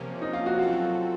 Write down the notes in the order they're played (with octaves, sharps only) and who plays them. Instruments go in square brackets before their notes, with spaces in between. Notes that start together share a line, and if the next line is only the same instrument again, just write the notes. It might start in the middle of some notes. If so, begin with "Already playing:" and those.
Already playing: [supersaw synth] C3 F3 A#3 C#4
[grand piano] D#4
F4
F#4
[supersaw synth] F#3 C4 F#4 A4 [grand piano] F4